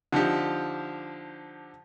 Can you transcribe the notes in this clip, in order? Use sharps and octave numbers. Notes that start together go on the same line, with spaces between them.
D3 F3 D#4 G4